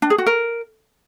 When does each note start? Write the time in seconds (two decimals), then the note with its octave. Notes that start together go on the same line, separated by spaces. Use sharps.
0.02 D4
0.10 G#4
0.18 F#4
0.26 A#4